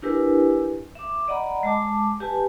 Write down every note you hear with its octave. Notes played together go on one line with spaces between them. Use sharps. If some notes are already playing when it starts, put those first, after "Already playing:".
D4 E4 G4 A#4 B4 G#5
E5 D6
D5 D#5 F#5 A#5 B5
G#3 A5 D6
G4 B4 G#5 A5